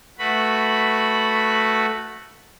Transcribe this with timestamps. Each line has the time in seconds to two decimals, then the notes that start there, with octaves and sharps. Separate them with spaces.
0.19 A3 F#4 B4 B5